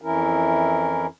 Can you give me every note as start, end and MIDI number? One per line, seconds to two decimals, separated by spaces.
0.02 1.07 41
0.02 1.07 52
0.02 1.07 61
0.02 1.07 64
0.02 1.07 70